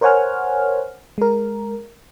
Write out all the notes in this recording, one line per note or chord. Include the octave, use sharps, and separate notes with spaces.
A#4 C5 C#5 F#5 G#5 F6
G#3 A#4